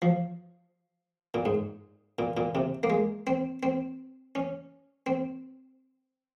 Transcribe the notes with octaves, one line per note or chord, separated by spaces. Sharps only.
F3
A#2
G#2
A#2
A#2
C3
A#3
G#3
C4
C4
C#4
C4